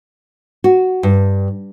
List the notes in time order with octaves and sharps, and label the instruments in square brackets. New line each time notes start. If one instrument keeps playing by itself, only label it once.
[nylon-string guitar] F#4
G2